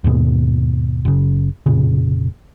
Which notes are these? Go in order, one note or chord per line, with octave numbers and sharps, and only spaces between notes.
D#2 G#2 B2
F#1 C#3
F1 A#2 C#3